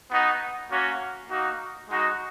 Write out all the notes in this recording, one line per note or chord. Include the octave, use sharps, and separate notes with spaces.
B3 D#4 F#4
A#3 C#4 F#4
A#3 D#4 F#4
G#3 D#4 F#4